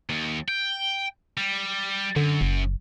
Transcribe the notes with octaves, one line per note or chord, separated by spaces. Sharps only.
D#2
G5
G3
F#2 D3
F#1